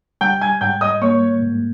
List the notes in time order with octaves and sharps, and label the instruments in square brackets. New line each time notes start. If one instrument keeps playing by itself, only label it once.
[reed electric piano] G3 [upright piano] G5 G6
[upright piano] G#5 G#6
[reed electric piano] G#2 [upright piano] G5 G6
[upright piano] D#5 D#6
[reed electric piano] A#3 [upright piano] C#5 C#6
[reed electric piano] G#2